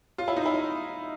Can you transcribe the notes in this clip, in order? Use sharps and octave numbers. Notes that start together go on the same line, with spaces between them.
F4
E4
D#4
E4